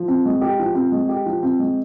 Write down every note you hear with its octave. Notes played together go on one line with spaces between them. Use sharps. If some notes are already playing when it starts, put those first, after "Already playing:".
Already playing: F3
C4
G#3
G4
F3
C4
G#3
G4
F3
C4
G#3